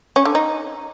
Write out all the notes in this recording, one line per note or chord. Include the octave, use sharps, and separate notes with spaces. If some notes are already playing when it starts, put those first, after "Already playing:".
C#4
D3
D#4